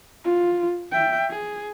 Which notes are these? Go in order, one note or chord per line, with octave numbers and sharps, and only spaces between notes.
F4
E5 G5
G#4